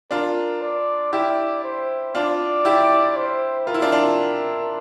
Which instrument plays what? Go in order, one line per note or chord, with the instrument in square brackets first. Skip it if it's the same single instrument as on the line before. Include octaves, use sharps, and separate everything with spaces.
[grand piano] D4 F4 [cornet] A#4
[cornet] D5
[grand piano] E4 G4 [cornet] D5
[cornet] C5
[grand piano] D4 F4 [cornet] D5
[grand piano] E4 G4
[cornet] C5
[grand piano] F4 [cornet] A#4
[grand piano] E4
D4 F4
D4 F4